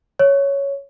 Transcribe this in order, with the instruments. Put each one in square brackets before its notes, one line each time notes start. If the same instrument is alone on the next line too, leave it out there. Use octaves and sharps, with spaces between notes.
[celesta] C#5